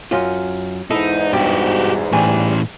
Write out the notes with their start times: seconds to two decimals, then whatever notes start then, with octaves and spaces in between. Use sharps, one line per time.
0.11 F#2 C#4 F4
0.91 E2 G#2 D#4 E4 A4
1.33 G2 B2 F#4 G4
2.12 A2 E3 G3 G#5